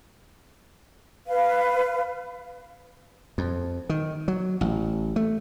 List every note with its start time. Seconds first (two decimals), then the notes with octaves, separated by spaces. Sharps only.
1.27 B4 F5
3.38 F2
3.89 D#3
4.28 F#3
4.61 A1
5.16 A3